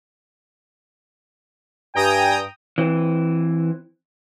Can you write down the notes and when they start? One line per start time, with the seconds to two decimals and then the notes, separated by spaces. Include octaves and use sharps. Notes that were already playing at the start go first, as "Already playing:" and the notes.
1.95 G2 G5 G#5 A#5 D#6
2.78 E3 C4